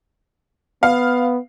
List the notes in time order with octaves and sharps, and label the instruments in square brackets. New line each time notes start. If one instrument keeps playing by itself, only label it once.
[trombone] B3 [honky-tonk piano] F5